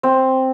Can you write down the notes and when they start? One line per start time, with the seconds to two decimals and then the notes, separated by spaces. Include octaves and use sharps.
0.03 C4